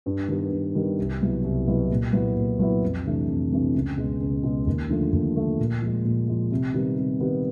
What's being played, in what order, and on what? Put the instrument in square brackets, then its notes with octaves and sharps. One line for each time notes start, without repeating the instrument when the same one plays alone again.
[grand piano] G2
D#3 G3 B3
G2
D#3 G3 B3
C2
B2 F#3 B3 E4
C2
B2 F#3 B3 E4
A#2
F#3 B3 E4
A#2
F#3 B3 E4
F2
C3 E3 A3 D4
F2
C3 E3 A3 D4
C#2
B2 G#3
C#2
B2 G#3
D#2
D3 F3 A3
D#2
D3 F3 A3
A#2
F3 G#3
A#2
F3 G#3
C3
D#3 G3 B3
C3
D#3 G3 B3